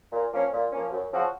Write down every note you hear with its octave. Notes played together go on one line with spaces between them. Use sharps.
A#2
F3 A#3 C#4
A#2
F3 A#3 C#4
F#2
C#3 F3 C4 F#4